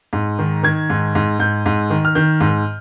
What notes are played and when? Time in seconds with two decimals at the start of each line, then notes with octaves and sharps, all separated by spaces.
0.13 G#2
0.39 D#3
0.63 D#3 G#6
0.90 G#2
1.15 G#2
1.39 G#2 G6
1.66 G#2
1.90 D#3
2.05 F6
2.15 D#3 G6
2.41 G#2